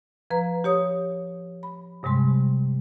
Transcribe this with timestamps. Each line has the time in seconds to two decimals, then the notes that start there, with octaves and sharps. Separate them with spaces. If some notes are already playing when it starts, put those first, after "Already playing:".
0.30 F3 B4 A#5
0.64 G4 C#5 D#6
1.63 B5
2.03 G2 C3 G3 G#3 C6